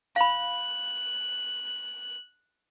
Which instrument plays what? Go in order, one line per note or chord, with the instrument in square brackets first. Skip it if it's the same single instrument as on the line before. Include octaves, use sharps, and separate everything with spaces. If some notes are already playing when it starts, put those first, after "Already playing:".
[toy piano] F5 B5 [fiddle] F#6